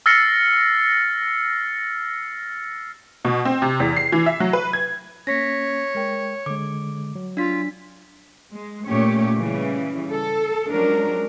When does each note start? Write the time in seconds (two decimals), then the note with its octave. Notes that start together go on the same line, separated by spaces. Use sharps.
0.06 E6 F6 A6 A#6 C7 C#7
3.25 B2
3.45 C4
3.62 C3
3.80 E2
3.97 C7
4.12 E3
4.26 E5
4.40 F#3
4.53 B4
4.73 G#6
5.27 A#3 C#4 C#5 A#6 B6
5.95 G#3 A#4 G5
6.46 D3 G#3 D6
7.15 F#3
7.37 D4 F4 B6
8.52 G#3
8.87 A#2 A3 C#4 G4 C#5
9.38 C#3 E3 G3
10.12 A4
10.71 F3 F#3 G#3 C#4 D4 A#4